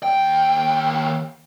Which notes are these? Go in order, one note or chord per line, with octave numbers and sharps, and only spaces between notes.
D#2 G5